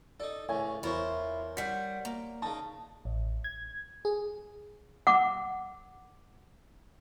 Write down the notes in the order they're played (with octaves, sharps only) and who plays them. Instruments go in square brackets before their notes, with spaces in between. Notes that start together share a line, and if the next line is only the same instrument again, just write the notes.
[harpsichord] D#4 A4 [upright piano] D5
[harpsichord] C#2 A2 [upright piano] C#5 E5 G#5
[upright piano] E2 [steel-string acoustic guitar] E4 F4 [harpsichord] A#4 C5 C#5
[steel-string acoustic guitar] G3 F#5 [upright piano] B6
[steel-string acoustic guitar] A#3
[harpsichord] C#3 D#4 [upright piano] A5
[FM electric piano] A1
G#6
G#4
[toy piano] F#5 D6